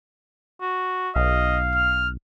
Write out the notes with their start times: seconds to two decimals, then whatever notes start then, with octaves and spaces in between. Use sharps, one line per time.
0.61 F#4
1.16 B1 D#5 F5
1.75 F6